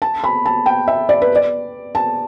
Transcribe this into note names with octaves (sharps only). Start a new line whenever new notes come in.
A5
B5
A5
G5
E5
D5
B4
D5
A5